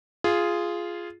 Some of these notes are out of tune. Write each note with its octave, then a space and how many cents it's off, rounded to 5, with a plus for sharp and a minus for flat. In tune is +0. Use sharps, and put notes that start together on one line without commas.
F4 -10 G#4 +0